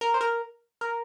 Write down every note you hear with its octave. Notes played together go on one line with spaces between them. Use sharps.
A#4
C5
A#4
A#4